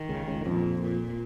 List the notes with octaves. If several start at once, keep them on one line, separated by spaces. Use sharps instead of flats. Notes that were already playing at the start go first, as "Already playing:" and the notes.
Already playing: D#3
C#2 C#3
C#2 C#3
D#3
F2 A#2 F3
A#2